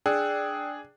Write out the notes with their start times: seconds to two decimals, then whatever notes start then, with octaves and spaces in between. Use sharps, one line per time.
0.06 D4 G#4 G5 E6 F#6